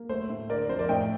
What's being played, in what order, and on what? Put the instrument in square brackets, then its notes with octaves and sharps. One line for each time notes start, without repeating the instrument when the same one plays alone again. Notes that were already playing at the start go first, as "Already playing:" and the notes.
Already playing: [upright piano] A#3
A3 C5
A2
D3 A#4 D5
F2 C5
A#4 D5
A2 D#5 G5